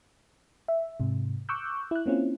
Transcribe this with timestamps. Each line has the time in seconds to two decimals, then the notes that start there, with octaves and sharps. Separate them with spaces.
0.68 E5
1.00 G#2 C3
1.49 C#6 D6 E6 F#6 G6
1.91 E4 F#6
2.06 A#3 C4 C#4 E4 F4